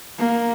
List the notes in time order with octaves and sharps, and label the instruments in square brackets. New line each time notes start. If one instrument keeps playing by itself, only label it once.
[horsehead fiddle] A#3